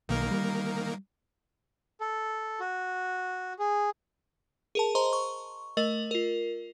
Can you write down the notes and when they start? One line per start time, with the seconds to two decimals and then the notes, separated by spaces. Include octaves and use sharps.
0.09 B1 D#3 A#3 A#4
0.31 G3
2.01 A4
2.60 F#4
3.59 G#4
4.75 G#4 A#4 A5
4.95 C5 D#5 A#5 C6
5.13 C#6
5.77 A3 A#4 D#5 F#7
6.11 F4 A#4